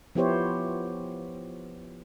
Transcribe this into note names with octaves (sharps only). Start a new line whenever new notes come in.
F3 B3 E4 G4 C5 C#5